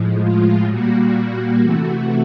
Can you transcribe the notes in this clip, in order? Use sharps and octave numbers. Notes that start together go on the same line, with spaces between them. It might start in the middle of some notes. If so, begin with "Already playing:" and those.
Already playing: A2 F3 G#3
F4
A#2 G3 A#3 F#4
C3 E3 A3